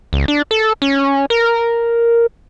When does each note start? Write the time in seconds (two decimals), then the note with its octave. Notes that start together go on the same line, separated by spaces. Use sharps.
0.13 C#2
0.28 D4
0.51 A4
0.82 C#4
1.30 A#4